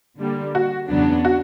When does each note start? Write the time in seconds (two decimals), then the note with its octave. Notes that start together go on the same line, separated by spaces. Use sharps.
0.19 D3 G3 A#3
0.55 F#4
0.89 E2 C#3 F#3 B3 D4
1.25 F#4